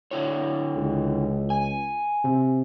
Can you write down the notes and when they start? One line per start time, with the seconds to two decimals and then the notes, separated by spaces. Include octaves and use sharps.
0.11 D3 E4 C#5
0.76 C#2
1.50 G#5
2.24 C3